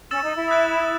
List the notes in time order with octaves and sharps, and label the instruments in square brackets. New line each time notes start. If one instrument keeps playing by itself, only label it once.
[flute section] C#4 [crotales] E6 A6 E7
[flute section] D#4
E4
[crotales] D#6 F#6 A6